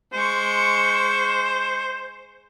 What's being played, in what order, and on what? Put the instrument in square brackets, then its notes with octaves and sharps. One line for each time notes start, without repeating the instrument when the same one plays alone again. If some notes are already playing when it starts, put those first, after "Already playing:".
[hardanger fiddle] G#3 C#6 [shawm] C5